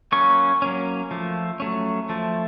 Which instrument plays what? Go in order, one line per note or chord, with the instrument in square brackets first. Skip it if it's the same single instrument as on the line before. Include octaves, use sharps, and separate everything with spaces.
[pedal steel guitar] F#3 A#3 C#4 C#6
F#3 A#3 C#4
F3 A3
F#3 A3 C#4
F3 A3